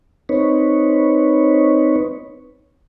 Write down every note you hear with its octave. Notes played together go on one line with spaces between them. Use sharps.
C4 D#4 B4 C#5